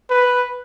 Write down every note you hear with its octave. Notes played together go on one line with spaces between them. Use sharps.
B4